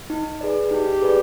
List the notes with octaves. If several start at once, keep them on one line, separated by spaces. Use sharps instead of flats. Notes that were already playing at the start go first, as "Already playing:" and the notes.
D#4
G#4 B4 D5
D#4 G4
G#4 B4 D5